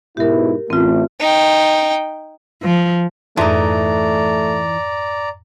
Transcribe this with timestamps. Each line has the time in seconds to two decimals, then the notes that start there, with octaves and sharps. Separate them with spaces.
0.17 G#2 B2 E4 G4 A#4
0.70 A1 A2 A3 C4 F4
1.20 D#4 G5
2.63 F3
3.37 F2 G#2 E3 A3 D#4 D5 A#5